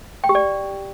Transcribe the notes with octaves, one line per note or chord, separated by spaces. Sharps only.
G5
G4
D5